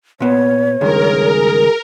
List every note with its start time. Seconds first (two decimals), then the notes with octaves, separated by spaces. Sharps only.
0.20 A#2 B3 C#5
0.81 C#2 G2 D#3 G#4 A#4